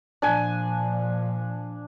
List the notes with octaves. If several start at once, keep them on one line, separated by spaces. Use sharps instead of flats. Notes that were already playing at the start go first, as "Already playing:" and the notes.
A#2 F3 D4 G#5